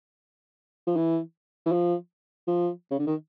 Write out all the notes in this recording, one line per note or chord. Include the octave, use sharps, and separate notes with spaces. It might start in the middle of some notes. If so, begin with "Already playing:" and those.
F3
E3
E3
F3
F3
C#3
D3
D#3